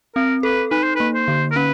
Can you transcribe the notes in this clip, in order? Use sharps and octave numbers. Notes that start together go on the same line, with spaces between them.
C4 A#4
A4 B4
D#4 B4
C5
A#3 B4
C5
D3
A#4
C#4 B4